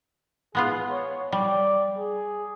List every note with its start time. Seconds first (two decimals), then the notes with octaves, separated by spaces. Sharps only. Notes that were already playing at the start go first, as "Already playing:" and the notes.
0.55 G#3 B3 F4 G#4
0.91 C#5
1.32 G3 D5
1.98 G#4